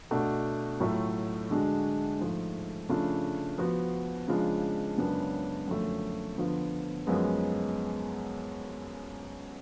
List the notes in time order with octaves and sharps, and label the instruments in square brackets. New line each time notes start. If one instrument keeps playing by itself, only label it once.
[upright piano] B2 A3 D4 F#4
A2 F#3 A3 F4
D3 G#3 D4 F#4
G#2 F3 A3
C#3 F3 A3 D4 F4
F3 B3 F#4
C#3 F3 G#3 D4 F4
F#2 C#3 G#3 B3 D4
F#2 D3 F3 A3
D3 F3 B3 F4
F#2 F3 G#3 B3